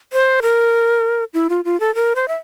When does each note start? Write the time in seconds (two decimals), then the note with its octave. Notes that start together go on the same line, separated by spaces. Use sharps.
0.13 C5
0.42 A#4
1.34 E4
1.49 F4
1.65 F4
1.80 A4
1.95 A#4
2.16 C5
2.28 E5